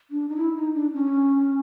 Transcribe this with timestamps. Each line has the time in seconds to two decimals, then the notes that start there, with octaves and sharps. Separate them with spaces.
0.11 D4
0.29 D#4
0.36 E4
0.56 D#4
0.74 D4
0.94 C#4